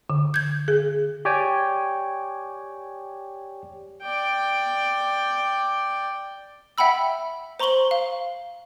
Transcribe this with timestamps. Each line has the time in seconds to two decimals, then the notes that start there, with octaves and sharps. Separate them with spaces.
0.10 D3
0.34 G6 G#6
0.68 G#4
1.25 G4 C#5 D5 G5 G#5
4.02 D5 G5
6.78 E5 F#5 G5 B5 E6
7.60 C5 A#5 C6 C#6 F#7 G7
7.91 F5